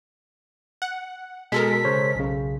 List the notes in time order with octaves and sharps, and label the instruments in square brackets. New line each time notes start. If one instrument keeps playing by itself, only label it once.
[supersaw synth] F#5
[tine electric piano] B2 [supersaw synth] G#3 A4 A#4 [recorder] B6
[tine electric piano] C#3 C5 C#5
B1 C#3